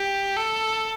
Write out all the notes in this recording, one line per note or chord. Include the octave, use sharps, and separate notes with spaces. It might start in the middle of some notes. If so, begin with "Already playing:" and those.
Already playing: G4
A4